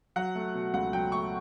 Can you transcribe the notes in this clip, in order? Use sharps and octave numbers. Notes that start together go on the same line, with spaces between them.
F#3 F#5
A3
B2
C#2 F#5
F#3 G5
A3 C#6